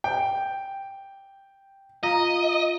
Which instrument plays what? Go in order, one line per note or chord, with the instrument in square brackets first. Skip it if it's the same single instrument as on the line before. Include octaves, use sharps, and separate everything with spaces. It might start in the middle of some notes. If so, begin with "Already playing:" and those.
[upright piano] G5
[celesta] F4 F5 A#5 [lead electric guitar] D#5